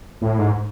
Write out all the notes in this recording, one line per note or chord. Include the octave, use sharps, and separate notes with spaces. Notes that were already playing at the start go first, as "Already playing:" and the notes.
A2
G#2